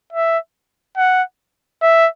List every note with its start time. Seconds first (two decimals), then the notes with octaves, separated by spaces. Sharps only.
0.13 E5
0.97 F#5
1.83 E5